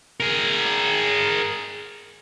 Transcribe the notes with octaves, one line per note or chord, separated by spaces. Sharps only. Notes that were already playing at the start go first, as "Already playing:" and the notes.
G#4 A#4